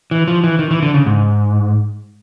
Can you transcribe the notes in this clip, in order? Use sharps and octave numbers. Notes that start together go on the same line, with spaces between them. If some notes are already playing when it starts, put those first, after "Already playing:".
E3
F3
E3
D#3
E3
D3
C#3
G#2